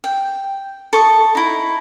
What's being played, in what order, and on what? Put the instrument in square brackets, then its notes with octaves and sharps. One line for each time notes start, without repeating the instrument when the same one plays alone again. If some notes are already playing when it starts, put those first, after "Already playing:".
[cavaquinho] G5
A4 C#6 D#6
D#4 E4